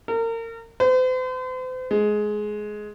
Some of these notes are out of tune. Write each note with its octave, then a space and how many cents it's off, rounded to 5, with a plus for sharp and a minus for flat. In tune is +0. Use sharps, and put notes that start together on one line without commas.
A#4 -30
C5 -40
G#3 +15